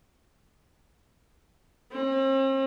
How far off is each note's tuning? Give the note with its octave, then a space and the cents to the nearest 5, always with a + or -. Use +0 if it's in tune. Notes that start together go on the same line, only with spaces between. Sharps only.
C4 +45